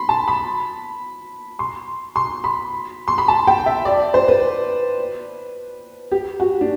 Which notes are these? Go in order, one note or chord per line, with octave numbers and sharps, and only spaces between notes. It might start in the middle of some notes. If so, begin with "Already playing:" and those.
Already playing: B5 C6
A5
B5
C6
C6
B5
C6
B5
A5
G5
E5
D5
C5
B4
G4
F#4
D4